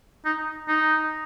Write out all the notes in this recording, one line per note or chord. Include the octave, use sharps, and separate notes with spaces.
D#4
D#4